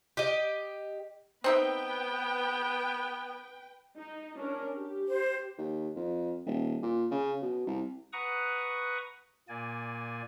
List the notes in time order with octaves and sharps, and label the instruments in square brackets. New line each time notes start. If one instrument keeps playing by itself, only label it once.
[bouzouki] G4 D#5
[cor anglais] B3 [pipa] C4 D#4 E5 [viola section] B4 G5
[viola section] D#4
C#4 D4 A#4
G4
[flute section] C5
[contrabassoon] D#2
F2
D#1
A#2
C#3
B2
C2
[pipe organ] B4 F#5 A#5 C#6 D#6
A#2 A#3 D5 G#5